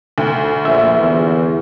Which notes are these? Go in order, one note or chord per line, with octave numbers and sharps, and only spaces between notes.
D2
A#1 E5
E2